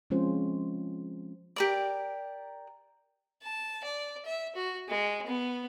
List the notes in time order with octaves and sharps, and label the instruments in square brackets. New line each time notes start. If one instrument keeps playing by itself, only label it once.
[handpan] F3 G#3 C4 C#4 F4 C5
[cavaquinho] G4 A#4 D5
[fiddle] A5
D5
E5
F#4
G#3
B3